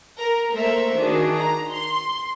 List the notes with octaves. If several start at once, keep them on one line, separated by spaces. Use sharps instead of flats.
A#4
A3 A#3 A4 A#4 C5 E5
D#3 D4 F#4 G#4
A#5
C6